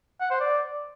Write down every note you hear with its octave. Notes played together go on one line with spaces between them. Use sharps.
F#5
C5
D5